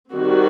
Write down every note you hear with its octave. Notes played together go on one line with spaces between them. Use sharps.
D#3 G3 C4 F#4